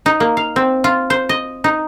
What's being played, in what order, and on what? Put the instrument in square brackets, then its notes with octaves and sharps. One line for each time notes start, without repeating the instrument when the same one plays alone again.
[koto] D#4
A#3
F5
C4
F4
C5
D#5
D#4